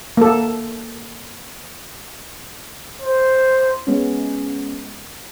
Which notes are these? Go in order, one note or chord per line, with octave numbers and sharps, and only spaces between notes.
A#3 A4
C5
G#3 B3 C#4